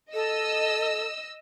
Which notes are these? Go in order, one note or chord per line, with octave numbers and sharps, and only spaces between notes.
A4 D#5 E6